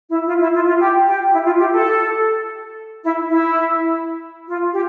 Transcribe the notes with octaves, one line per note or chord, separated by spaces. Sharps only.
E4
F4
E4
F4
F4
G4
G4
E4
F4
G4
A4
E4
E4
F4
G4